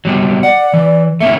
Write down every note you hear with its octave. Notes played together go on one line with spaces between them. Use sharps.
F#3 G3 B3
D5 F#5
E3
A3 A#3 C#4 E5